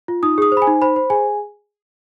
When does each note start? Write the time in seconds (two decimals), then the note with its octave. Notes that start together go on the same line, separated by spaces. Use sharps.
0.08 F4
0.23 D#4 D#6
0.38 G#4 D#6
0.52 C5
0.57 B5
0.62 G#5
0.67 D#4
0.82 C5 B5
0.96 C5
1.10 G#4 G#5